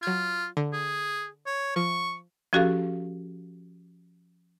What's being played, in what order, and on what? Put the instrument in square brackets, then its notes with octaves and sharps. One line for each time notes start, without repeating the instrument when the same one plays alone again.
[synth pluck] F#3 G#6 [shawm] F4
[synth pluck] D3
[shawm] G#4
C#5
[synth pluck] F3 [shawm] C#6
[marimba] F3 C#4 F#4 G4 A4 F5